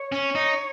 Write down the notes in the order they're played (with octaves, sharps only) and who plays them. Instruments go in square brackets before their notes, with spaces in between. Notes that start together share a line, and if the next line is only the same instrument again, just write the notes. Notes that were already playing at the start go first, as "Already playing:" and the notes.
Already playing: [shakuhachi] C#5
[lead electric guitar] C#4
D#4